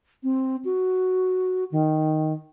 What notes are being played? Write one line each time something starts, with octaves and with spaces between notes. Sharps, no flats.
C4
F#4
D#3